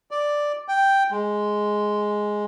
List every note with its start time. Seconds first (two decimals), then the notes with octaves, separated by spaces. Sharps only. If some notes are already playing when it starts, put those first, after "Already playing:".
0.11 D5
0.68 G5
1.11 G#3